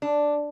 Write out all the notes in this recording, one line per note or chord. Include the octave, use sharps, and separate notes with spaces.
D4